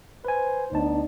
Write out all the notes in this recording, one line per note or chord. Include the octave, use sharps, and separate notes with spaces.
B4 C5 G#5
D2 B3 D4 D#4 C#5 A5